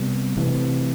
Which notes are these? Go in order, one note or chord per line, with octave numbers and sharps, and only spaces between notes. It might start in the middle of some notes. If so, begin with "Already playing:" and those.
Already playing: C3 G3 B3
C3 E3 A3